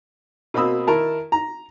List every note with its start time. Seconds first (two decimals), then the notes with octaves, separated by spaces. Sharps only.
0.54 B2 A#3 C4 B5 D#6 E6
0.87 D#3 E4 A#4 A5
1.32 A#5